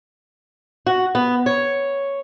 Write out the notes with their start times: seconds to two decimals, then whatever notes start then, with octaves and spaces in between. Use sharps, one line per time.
0.86 F#4
1.15 B3
1.46 C#5